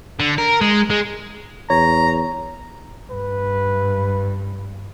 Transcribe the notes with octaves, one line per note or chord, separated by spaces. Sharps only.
D3
A#4
G#3
G#3
E2 C#5 A#5
G2 B4